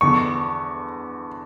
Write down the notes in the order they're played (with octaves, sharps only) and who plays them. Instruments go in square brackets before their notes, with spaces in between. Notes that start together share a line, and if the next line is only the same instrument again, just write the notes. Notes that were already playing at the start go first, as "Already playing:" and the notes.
[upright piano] E2 D3 C#6